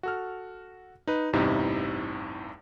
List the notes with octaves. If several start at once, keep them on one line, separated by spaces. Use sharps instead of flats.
F#4 A4 F6
D#4 B4
A1 E2 G2 C3 D#4 E4